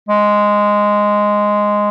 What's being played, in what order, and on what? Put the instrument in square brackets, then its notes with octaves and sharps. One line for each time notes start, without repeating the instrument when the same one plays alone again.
[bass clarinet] G#3